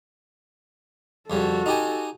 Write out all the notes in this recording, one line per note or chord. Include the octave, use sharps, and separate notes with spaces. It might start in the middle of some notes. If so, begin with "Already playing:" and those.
F2 C#3 G3 F#4 A4
D#4 G4 G#5